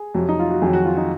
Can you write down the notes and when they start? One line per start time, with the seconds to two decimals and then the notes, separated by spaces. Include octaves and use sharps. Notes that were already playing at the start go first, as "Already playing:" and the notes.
Already playing: G#4
0.14 F2 C3 F#3
0.29 D#4
0.40 F4
0.51 F#4
0.62 F2 D#3 F#3 G#4
0.73 F#4
0.85 F4
0.97 D#4